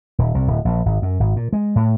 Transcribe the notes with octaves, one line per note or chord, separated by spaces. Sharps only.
D#1
C2
D1
A#1
G#1
F#2
G#1
A#2
G#3
A2